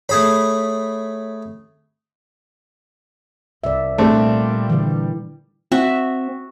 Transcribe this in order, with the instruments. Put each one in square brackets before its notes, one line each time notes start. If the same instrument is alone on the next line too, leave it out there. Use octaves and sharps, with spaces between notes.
[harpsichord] A3 G#4 B5 [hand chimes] C#5
[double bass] C2 [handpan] D5 E5
[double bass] A#2 G3 [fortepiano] A3 C4 D4
[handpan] D3 E3
[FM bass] C4 [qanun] F#4 E5